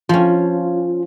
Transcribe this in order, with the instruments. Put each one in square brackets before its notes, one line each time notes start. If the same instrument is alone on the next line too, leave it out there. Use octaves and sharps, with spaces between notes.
[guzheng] F3 C#4 [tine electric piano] F4